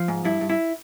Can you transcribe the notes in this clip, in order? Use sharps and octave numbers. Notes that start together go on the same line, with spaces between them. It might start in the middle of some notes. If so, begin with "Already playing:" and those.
Already playing: F3
G#2
G2 E4
G2
E4